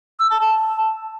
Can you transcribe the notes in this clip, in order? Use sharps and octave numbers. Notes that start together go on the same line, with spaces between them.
E6
A5
A5